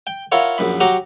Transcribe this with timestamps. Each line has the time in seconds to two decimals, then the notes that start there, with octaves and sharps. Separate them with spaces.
0.07 G5
0.32 E4 F4 A#4 C#5 F#5
0.58 A#1 F#2 B5
0.81 F#3 F#4 G4 F#5 A#5